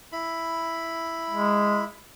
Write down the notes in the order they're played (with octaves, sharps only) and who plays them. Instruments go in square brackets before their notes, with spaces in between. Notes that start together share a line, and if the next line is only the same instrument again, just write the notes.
[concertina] E4 B5
[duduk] G#3